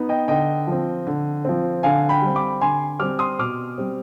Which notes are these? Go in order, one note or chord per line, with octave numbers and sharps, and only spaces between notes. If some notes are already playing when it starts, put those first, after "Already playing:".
Already playing: B3 D#4
D#5 G5
D3 D#5 G5
F3 C4
D3
F3 C4
D3 F5 G#5
G5 B5
G3 C4
B5 D6
D3 G#5 C6
G3 C4 D6 F6
C6 D#6
B2 D6 F6
G3 C4